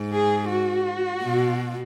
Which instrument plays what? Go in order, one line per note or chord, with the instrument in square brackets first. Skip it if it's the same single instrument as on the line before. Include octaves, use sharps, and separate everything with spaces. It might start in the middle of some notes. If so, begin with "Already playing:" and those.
Already playing: [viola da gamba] G#2
[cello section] G#4
F#4
[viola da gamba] B2